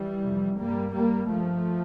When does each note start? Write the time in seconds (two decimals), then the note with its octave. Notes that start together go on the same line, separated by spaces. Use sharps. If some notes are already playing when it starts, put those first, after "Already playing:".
Already playing: E3 G3
0.23 F2 C3
0.58 G2 G3 A#3
0.93 G2 G3 A#3
1.29 G2 F3 A3